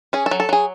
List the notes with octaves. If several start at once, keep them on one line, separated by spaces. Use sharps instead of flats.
C#4 G#4
A4
F#3
A4
F#3 G#4